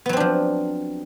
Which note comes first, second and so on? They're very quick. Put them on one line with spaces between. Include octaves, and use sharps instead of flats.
B3 F#3 C4 D4 F3